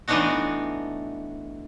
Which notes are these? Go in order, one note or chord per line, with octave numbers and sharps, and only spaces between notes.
E3 A3 B3 D4 D#4 F#4